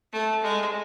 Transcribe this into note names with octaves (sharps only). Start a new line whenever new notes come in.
A3
G#3